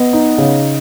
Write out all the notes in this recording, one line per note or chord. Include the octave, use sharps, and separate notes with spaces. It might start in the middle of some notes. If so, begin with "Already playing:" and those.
Already playing: B3 D#5
D#4
C#3